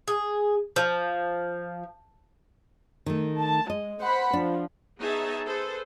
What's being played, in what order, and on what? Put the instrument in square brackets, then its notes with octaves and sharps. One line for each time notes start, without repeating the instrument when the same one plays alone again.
[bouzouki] G#4
F3
[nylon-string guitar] D#3 A3
[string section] A5
[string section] G#3 [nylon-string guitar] D#5
[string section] C5 F#5 B5
[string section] F3 [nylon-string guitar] D4
[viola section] B3 D#4 G#4 C#5 E5 A5
G#4 A4 B4 C5